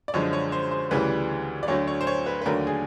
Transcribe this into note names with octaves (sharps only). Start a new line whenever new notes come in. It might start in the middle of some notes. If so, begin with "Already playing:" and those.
D5
F#2 D3 F3 G#3 C#5
C#5
C5
C5
D2 C#3 E3 G3 B4
D5
D2 D3 F#3 A3 C#5
C#5
C5
C#5
B4
B4
D#2 D3 F#3 A3 A#4
G#4